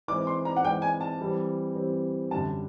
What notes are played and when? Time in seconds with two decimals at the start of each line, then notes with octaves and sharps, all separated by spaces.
0.08 E3 G#3 C4 D6
0.27 C6
0.45 A#5
0.56 F#5
0.64 E3 G#3 C4 G5
0.82 G#5
1.01 A5
1.20 E3 G3 C4
1.75 E3 G3 C4
2.31 F#2 D3 G3 A5